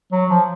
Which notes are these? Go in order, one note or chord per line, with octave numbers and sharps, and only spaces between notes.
F#3
F3